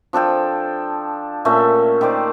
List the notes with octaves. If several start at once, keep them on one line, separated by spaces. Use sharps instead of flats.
F3 D4 A4 G5
A#2 A3 C#4 E5
D#3 G4 C5 D5